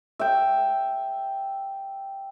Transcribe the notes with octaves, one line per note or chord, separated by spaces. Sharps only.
E5 G5